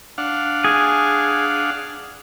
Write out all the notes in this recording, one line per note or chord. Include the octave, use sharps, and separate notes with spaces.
D4 F5 F#5
G#4